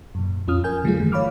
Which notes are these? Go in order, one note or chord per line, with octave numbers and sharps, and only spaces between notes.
F#2 A#2
F2 C#4 F4 D#6 F6
A#4 G#5 G6
D3 F#3 G3 A3 F4 G#4
G2 D#3 E3 A3
C#5 F5 B5 D6 F6